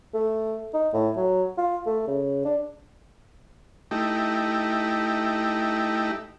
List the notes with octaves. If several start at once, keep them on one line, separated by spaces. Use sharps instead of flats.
A3
D#4
A2
F#3
F4
A3
C#3
D4
A3 D#4 E4 G4